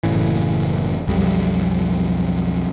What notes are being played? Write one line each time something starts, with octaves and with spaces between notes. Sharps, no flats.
F#1 A2 C#3 E3
B1 F2 G3